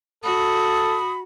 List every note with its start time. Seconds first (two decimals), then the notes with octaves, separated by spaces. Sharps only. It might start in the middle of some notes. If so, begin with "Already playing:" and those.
0.24 F#4 A4 B5 D#6